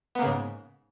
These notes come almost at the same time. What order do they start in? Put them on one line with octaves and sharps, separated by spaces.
B3 A#3 C#3 G#2